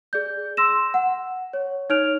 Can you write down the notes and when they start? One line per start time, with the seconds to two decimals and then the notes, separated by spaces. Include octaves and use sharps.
0.13 G#4 D5 G6
0.57 C6 E6 A#6 E7
0.94 F#5
1.53 C#5
1.90 D#4 C#5 F6 D7 F7